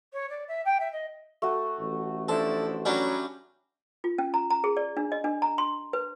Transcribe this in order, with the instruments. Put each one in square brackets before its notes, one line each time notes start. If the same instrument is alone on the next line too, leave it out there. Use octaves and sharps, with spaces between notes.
[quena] C#5
D5
E5
G5
E5
D#5
[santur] A3 F#4
[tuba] A1
[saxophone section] F3 D4 E4 [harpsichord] A4 [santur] C5
[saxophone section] F#3 [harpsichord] G3 C#4 D4 [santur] B5
[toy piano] F4
C#4
A#5
A#5
G#4
D5
D4
D#5
D4
A#5
C6
B4